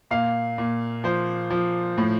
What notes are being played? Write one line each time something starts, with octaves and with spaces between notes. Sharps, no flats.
A#2 F5
A#2
F3 C5
F3
A2